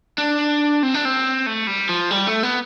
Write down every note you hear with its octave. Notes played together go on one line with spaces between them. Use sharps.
D4
C4
D4
C4
A3
G3
F3
G3
A3
B3